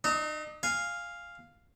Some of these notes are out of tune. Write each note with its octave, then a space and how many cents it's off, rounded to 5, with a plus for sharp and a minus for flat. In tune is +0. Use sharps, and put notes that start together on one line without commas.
D#4 -40 D#5 +35
F5 +0 G#5 -20